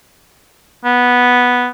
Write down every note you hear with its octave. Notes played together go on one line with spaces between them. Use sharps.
B3